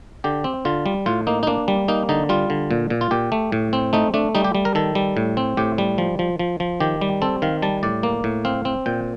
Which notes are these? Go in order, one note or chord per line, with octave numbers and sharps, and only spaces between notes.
D3 G4
C4
D3 F4
G3
A2 F4
A#3 D#4
D#4
A#3 D4
G3
A#3 D#4
D3 D#4
G3 F4
D3
A#2
A#2
F4
A#2 G4
A3
A2
C4
A3 D#4
A3 D4
G3 D#4
G4
G3
A#4
D#3 A4
G3
A2
C4
A2 G4
G3
F3
F3
F3
F3
D#3 G4
G3
C4 A4
D#3 F5
G3 A5
A2 D5
A#3
A2
C4 F5
C4
A#2 G5